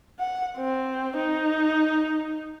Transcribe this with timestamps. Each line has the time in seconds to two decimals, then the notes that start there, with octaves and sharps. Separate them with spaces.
0.19 F#5
0.56 C4
1.16 D#4